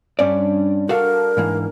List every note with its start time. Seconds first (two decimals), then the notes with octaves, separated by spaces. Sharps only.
0.19 G2 G3 C#4 D5
0.89 D4 F#4 A4 A#4 F5
1.37 G#2 E3 A#3